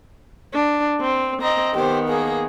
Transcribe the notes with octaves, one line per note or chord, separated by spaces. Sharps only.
D4
C4
C4 D#5 A#5
D#3 B3 G4 C5
A#3 G#4